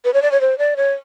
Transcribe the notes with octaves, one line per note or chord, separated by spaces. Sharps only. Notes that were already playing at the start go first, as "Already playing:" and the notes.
B4
C#5
D5
C#5
C5
D5
C#5